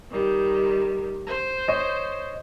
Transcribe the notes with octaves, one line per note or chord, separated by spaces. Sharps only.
D#3 G3
C5
C#5 D#5